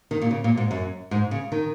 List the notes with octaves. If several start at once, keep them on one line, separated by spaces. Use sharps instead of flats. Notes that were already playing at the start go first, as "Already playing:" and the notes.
D#3
A#2
C#3
A#2
G#2
F#2
G#2
C#3
D#3